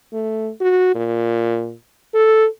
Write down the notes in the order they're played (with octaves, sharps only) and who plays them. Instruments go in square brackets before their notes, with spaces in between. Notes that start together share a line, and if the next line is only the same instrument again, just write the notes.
[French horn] A3
F#4
A#2
A4